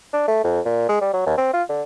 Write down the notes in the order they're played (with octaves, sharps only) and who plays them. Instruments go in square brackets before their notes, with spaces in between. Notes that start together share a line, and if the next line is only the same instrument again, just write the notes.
[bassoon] D4
A3
F2
A#2
G#3
G3
F#3
D#2
C4
F4
D3